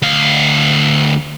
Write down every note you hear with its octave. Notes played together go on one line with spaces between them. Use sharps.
D2 F5